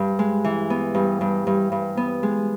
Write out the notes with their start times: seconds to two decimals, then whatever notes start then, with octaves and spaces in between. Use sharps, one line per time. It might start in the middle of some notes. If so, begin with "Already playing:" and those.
Already playing: G2
0.19 G#3
0.44 E3
0.70 B3
0.95 G2
1.21 G2
1.47 G2
1.72 G2
1.97 B3
2.23 G#3